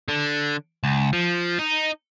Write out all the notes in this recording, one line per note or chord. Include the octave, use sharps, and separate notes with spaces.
D3
C#2
F3
D#4